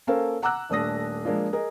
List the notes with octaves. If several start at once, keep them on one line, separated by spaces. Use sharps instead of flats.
A#3 C#4 A4 A#4 C5 F5
F#5 A#5 D6 E6 F#6
D#1 A3 D4 D#6 A#6
F3 G#3 A#3 D4 F4
G#4 A#4 D#5